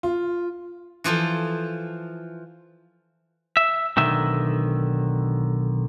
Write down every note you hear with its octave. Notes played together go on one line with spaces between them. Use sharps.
F4
E3 F3 F4 A4
E5
B1 D3 D#3 E5